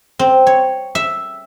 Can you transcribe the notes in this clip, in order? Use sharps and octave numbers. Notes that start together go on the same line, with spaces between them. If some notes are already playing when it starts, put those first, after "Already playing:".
C4
C#5
E5